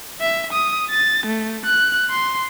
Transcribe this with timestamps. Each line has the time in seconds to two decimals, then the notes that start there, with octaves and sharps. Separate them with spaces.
0.21 E5
0.53 D#6
0.90 A6
1.26 A3
1.66 F#6
2.10 C6